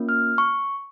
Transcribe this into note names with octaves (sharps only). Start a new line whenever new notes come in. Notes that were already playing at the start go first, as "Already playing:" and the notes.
Already playing: A#3 C#4 F4
F6
C#6